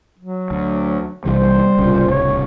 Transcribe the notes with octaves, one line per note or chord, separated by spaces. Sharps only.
F#3
D2
B1 C3 E3 G3 C5
D1 C2 A#2 C#3
C#5